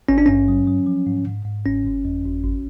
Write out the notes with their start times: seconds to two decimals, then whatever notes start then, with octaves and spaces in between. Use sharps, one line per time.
0.09 G#1 C#4
0.18 D4
0.26 G2 C#4
0.48 F#3
0.67 F#3
0.86 F3
1.06 G#2
1.27 G#2
1.45 G#2
1.65 G1 C#4
1.86 G1
2.05 F2
2.25 G1
2.44 G#1